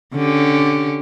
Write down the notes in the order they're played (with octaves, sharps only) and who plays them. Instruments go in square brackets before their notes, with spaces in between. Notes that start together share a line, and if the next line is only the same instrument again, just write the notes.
[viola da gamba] D3 C#4 G4